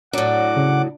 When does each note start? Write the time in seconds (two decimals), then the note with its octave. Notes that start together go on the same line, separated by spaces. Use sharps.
0.13 A2 F#3 D4 F#5 D6
0.57 C#3